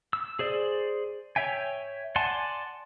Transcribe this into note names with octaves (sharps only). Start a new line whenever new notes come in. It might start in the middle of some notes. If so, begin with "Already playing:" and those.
E6
G#4 C5 D5
C#5 E5 G5 G#5
D5 F#5 G#5 A5 C6